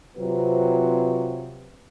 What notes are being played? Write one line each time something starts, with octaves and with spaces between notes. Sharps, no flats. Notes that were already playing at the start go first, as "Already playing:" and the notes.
C3 F#3 C4 F4 B4